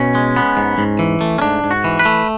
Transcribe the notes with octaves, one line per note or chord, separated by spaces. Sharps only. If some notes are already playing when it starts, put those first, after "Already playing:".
Already playing: B2 C#4
G#3
B3
G#2
G#2
E3
A3
C#4
G#2 D4
G#2
F#4
E3
B4
A3